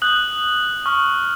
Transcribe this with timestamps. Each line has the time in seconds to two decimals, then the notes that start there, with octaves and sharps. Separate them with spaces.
0.02 D#6 F#6 G6 F#7
0.86 C#6 F6